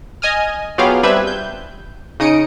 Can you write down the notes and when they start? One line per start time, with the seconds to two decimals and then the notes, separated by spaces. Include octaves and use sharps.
0.22 D#5 G#5 D#6 F6
0.78 F#3 B3 F4 G4 G#4 F5
1.03 G3 C4 D4 B4 E5 G#6
1.27 G6
2.20 C#3 D#4 D#6 C#7 D7